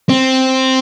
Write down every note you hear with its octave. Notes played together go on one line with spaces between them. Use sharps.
C4